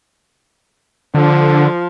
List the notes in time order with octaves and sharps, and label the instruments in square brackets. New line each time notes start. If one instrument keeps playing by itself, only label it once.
[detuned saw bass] D3 [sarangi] F3